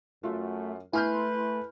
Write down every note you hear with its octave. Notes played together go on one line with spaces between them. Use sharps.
F#2 A3 F4 F#4
A3 E4 B4 G#5 C6 F6 G6